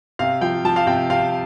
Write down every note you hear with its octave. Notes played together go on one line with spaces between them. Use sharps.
C3 F5
F3 G5
F3 A5
F5
C3 G5
C3 F5